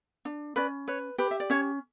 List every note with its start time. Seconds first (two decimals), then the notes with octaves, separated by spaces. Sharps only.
0.25 D4
0.56 C#4 B4 D5
0.88 B4 C#5
1.18 G4 B4
1.31 E5
1.40 D5
1.50 C#4 C#5